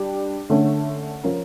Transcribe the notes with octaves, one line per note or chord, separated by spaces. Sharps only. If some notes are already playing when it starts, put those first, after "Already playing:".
Already playing: G3 D4 G4
D3 A3 C#4
F3 C#4 F4 A#4